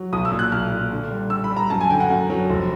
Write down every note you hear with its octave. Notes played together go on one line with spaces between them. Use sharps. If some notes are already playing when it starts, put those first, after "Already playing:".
Already playing: F#3
B1 D#6
E6
A#2
F#6
B1 F6
A#2
D3
G3
G3 E6
B5
G3
A#5
F#2 A5
G#5
D3 G5
F#5
F#2
F#3
F1